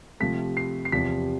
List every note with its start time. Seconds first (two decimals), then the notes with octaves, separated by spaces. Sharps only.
0.20 C3 F3 A3 B6
0.57 C7
0.85 C7
0.92 E2 C3 F3 B6